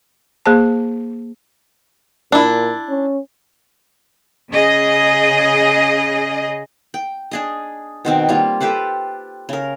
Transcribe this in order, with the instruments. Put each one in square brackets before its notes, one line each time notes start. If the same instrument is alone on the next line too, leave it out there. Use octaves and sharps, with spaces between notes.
[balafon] A#3 G#4 C5 A5
[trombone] A#2 [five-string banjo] D4 E4
[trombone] C#4
[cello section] C#3 G#4 D#5
[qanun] G5
D4 G#4 D#5
B2 D#3 C4
G3 A#3 F4
G4 A4 B4 C5
C#3 A#4